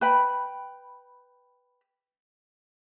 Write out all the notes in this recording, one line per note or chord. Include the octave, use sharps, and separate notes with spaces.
B4 G5 B5